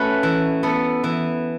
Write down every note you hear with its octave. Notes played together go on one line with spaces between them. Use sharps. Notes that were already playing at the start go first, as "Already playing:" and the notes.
Already playing: A3 C#4 F#4 B4
E3
B3 A4
E3